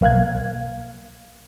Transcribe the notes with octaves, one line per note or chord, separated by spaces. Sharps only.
B1 A#3 F5 F#6 G#6